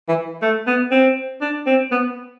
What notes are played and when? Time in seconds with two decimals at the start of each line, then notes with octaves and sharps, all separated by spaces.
0.09 E3
0.42 A3
0.67 B3
0.91 C4
1.42 D4
1.67 C4
1.92 B3